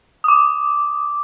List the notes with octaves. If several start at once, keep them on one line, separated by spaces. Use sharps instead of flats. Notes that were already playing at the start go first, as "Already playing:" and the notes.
D6 D#6